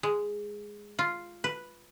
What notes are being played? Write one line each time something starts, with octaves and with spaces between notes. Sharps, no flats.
G#3
F4
B4